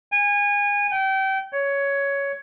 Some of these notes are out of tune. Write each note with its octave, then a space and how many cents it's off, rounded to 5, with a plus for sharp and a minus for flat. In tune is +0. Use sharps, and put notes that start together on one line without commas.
G#5 -25
G5 -30
C#5 +10